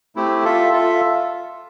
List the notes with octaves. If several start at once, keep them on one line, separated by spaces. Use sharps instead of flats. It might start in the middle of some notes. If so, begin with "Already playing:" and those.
A3 C4 E4 G4
F4 A4 E5
F4 A4 E5